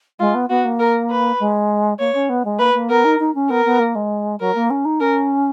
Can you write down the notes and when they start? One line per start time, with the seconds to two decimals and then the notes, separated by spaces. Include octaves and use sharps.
0.20 G#3 F4
0.34 B3
0.49 B3 F#4
0.64 A#3
0.79 A#4
1.10 B4
1.39 G#3
1.99 A#3 C#5
2.14 C#4
2.29 B3
2.45 G#3
2.59 A#3 B4
2.74 A#3
2.89 B3 A#4
3.04 D#4
3.19 D#4
3.35 C#4
3.50 B3 A#4
3.65 B3
3.79 A#3
3.95 G#3
4.40 F#3 A#4
4.55 A#3
4.70 C#4
4.85 D#4
5.00 C#4 A#4